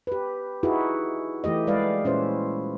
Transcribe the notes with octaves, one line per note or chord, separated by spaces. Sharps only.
G4 B4
D#4 E4 F#4 G#4 B4
E3 A3 G4 D#5
G3 G#3 B4 D5 F5
A#2 C#4 E4 B4 C5